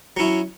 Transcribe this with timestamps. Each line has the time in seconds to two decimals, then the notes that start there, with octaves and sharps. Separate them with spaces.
0.17 F#3 C#4 E4